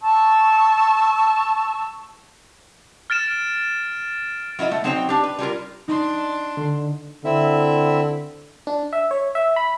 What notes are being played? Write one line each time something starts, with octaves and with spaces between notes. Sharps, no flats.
A5 C#6 E6
F6 A6 D7 E7
F#3 E4 F4 D#5
A3
F#3 C4 D#4 C5 D#5 G5
D4 G4
B4
G3 E4 F4 A#4
D4 D#4 C6
D3
D3 C4 E4 E5
D4
E5
C#5
E5
B5